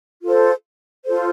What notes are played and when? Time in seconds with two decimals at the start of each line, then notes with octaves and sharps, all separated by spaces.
0.24 F4 A4 C5
1.05 F4 A4 C5